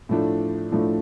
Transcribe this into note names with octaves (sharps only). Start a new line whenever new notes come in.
A2 F3 A3 D4
A2 F3 A3 D4